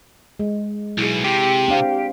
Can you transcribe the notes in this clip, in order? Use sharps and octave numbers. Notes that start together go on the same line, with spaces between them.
G#3
B1 B2 E4 G#4
C3 G4
C4 D4 F5